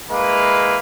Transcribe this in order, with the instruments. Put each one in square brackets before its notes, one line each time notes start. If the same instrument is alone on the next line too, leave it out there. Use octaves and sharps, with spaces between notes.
[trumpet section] G#3 A#3 E4 B4 F5